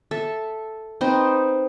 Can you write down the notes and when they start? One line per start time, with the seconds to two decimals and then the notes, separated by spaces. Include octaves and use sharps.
0.11 A4 E5
1.01 C4 D#4 B4 C5